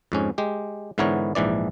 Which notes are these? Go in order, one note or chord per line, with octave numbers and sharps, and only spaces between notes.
F2 G#2 C#4
G#3 G4
G#2 D3 E3 B3 A#4 C#5
A#1 G#2 E3 D5